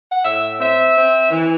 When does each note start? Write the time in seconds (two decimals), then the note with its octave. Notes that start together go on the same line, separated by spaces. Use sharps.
0.11 F#5
0.24 A2 E5
0.60 C4 E5
0.95 C4
1.30 E3